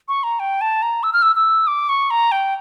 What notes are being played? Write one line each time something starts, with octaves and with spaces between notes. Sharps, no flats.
C#6
A#5
G5
A5
A#5
E6
F6
E6
E6
D6
C#6
A#5
G5